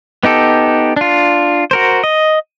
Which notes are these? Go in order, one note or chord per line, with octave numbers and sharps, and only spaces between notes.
B3 D#4 G4 A4
D4 F4
F#4 A#4 C5
D#5